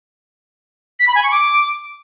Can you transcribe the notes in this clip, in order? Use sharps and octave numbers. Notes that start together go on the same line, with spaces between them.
B6
B5
G#5
C#6
D6